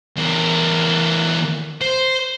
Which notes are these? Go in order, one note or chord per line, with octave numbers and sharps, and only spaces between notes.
E2 A#4
C5